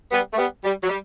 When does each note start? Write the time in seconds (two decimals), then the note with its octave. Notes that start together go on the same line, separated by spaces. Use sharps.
0.12 G3 B3
0.34 A3
0.38 G3 B3
0.64 G3
0.83 F#3
0.89 G3